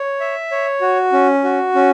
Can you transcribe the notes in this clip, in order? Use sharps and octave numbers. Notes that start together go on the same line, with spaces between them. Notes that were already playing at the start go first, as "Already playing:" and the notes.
Already playing: C#5
E5
C#5
F#4
C#4
F#4
C#4